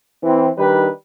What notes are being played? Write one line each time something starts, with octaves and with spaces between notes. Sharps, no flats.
E3 C4
D#3 G3 D4 D#4 G4 B4